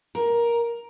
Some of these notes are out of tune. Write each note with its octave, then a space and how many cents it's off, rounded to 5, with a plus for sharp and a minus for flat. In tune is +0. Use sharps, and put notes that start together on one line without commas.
A#4 +10